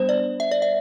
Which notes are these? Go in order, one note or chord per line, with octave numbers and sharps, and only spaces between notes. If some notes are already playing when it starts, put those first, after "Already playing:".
Already playing: G3 B3 D4 C5
D5
E5
D5
E5